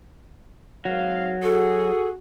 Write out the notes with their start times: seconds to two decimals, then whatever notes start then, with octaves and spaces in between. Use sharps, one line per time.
0.85 G#1 F#3 F5
1.43 F#4 G#4 A4